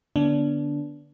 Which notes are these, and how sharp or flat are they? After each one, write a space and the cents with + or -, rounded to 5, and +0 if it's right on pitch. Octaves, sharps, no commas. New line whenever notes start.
D3 +0 B3 -25 D4 -20